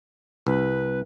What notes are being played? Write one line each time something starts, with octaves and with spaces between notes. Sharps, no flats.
C2 B4